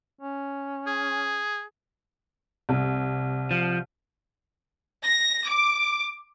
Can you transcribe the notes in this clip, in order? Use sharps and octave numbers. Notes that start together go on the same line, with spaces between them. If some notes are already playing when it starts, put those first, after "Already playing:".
C#4
G#4
C2
F3
A#6
D6